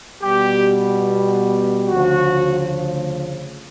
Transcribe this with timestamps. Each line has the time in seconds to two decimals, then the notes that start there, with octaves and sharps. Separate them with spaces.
0.23 B2 G3 B3 G4
1.89 D2 C#3 F3 F#4